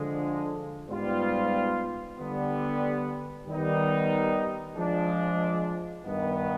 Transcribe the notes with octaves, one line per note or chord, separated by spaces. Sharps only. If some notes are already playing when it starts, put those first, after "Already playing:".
Already playing: D3 F3 G#3
G#2 G3 B3 F4
D3 G3 B3
D#3 G3 B3 D#4
F3 G#3 D4
G2 D#3 B3